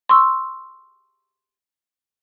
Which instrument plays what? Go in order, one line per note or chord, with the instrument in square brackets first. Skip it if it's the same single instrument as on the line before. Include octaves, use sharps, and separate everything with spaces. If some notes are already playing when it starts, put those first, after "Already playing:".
[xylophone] C6 C#6 E6